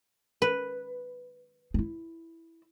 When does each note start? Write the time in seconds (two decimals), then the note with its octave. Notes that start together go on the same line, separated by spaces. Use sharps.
0.42 B4
1.74 D#4 E4